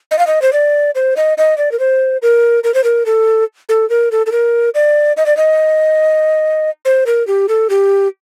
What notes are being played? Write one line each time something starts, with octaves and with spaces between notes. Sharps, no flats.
D#5
F5
D#5
C5
D5
C5
D#5
D#5
D5
A#4
C5
A#4
A#4
C5
A#4
A4
A4
A#4
A4
A4
A#4
D5
D#5
D5
D#5
C5
A#4
G4
A4
G4